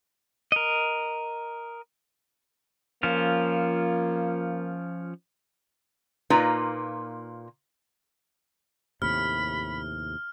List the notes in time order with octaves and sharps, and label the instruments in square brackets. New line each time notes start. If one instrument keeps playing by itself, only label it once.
[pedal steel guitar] A#4 D#5
[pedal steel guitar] F3 C#4 F4 [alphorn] A#3
[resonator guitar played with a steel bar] A#2 A#3 D#4 F4 B4 A#5
[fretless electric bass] D#2 A2 C3 [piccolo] B5 [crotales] F6